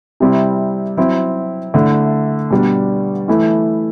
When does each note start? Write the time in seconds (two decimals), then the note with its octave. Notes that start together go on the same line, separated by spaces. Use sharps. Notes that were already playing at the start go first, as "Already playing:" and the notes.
0.20 C3 G3 C4 E4
0.97 F#3 C4 E4
1.74 D3 A3 E4
2.50 B2 G3 D4
3.28 E3 A3 E4